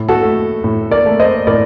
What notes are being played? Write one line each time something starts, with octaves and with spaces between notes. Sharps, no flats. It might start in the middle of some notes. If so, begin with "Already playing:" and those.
Already playing: A2
F#4 A4
A3
A2
A#4 D5
A3
C5 D#5
A2 A#4 D5